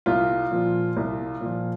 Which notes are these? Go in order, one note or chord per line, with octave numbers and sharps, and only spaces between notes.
C2 F4
A#2 F3
C2
A#2 F3